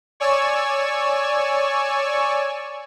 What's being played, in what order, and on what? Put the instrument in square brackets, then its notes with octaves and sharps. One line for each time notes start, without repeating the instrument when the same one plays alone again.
[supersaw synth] C#5 D5 G#5 C#6 E6